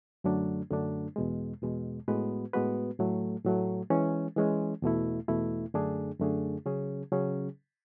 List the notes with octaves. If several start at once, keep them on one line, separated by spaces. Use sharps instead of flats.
F#2 D3 F#3 A3 D4
F#2 D3 F#3 A3 D4
E2 B2 G#3
E2 B2 G#3
A2 G#3 B3 F#4 B4
A2 G#3 B3 F#4 B4
A2 F#3 A3
A2 F#3 A3
E3 G#3 C#4
E3 G#3 C#4
E2 B2 A3 E4
E2 B2 A3 E4
F#2 D3 A3 D4 G#4
F#2 D3 A3 D4 G#4
C#3 F#3 C#4 G#4
C#3 F#3 C#4 G#4